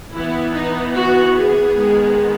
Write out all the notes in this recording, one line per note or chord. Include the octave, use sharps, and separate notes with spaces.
E3 B3 E4
D#4
F#4
G#4
D#3 G#3 B3